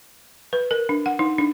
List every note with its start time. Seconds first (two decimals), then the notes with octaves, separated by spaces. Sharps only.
0.53 B4
0.71 A#4
0.89 D4
1.06 F#5
1.19 D#4
1.38 D4